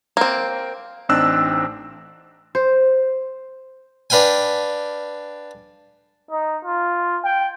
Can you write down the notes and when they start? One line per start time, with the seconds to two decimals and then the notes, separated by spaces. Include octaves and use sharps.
0.17 A#3 C4
1.09 A1 C4 D4 D#4 E6 F#6
2.55 C5
4.10 D4 B4 F5 G5 G#5
6.31 D#4
6.65 F4
7.25 G5